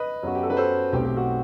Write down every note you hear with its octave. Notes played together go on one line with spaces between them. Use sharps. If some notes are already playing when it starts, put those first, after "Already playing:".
Already playing: B4 D#5
F#2 F#3 B3 F#4
G4
A4
B4
A4 C5
B1 B2 A3 C4 G4
G4
F#4